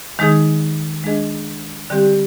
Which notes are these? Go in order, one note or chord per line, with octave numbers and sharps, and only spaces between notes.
D#3 G#3 D#4 G#4
G#3 D4 G#4 D#5
D3 G3 C4 G4